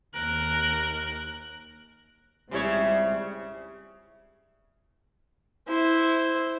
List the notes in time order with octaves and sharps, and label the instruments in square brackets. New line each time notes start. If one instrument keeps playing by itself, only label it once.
[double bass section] D#2 [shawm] A#4 [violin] F#6
[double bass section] C#2 G3 C4 [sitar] C#3 E4 C#5
[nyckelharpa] E4 C5